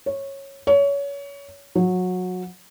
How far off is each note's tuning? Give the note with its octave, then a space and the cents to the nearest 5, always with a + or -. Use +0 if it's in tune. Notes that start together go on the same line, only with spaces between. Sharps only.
C#5 -15
C#5 +25
F#3 -20